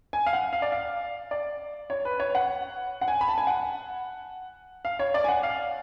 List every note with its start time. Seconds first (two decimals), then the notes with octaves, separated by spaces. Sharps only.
0.13 G#5
0.26 F5
0.33 F#5
0.53 F5
0.62 D5
0.72 F5
1.31 D5
1.90 C#5
2.05 B4
2.20 C#5
2.35 F#5
3.01 F#5
3.08 G#5
3.21 B5
3.28 A5
3.38 G#5
3.47 F#5
4.85 F5
4.99 C#5
5.14 D5
5.24 G#5
5.28 F#5
5.43 F5